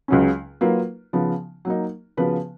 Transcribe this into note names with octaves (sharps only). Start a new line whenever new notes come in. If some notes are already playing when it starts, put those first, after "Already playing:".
C#2 C#3 F#3 C#4
F#3 A#3 F4 B4
C#3 F3 B3
F#3 A#3 D#4
C#3 F3 B3 F#4 B4